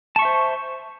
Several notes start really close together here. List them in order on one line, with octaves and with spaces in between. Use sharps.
A5 C#6 E5 C5